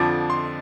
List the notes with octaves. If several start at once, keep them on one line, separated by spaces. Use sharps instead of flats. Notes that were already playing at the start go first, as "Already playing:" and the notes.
Already playing: F2 D3 F3 D6
C6